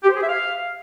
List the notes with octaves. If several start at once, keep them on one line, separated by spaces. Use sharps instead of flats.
G4
C5
G#4
E5
F5